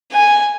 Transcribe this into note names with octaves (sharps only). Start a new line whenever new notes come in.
G#5